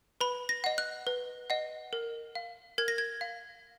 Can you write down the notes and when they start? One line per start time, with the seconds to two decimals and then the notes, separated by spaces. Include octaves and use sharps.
0.21 B4 B5
0.49 A#6
0.64 D#5 F#5
0.78 F#6
1.07 B4
1.50 D#5 F#5
1.93 A#4
2.35 F5
2.78 A#4 G#6
2.88 A#6
2.98 G#6
3.21 F5